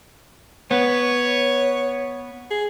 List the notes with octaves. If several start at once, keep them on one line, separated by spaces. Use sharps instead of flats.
B3 C#5
G#4